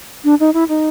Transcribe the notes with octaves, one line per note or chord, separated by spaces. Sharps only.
D4
D#4
E4
D#4